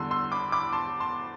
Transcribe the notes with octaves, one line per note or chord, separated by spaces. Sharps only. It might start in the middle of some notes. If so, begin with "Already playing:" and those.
Already playing: E2 D3 G3 C6 E6
C6 E6
B5 D6
B5 D6
A5 C6
A5 C6